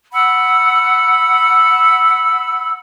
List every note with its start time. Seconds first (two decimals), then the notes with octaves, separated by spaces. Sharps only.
0.12 F#5 B5 E6